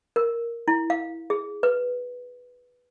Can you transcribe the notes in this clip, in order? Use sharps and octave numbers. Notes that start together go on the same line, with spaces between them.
A#4
E4
F5
G#4
B4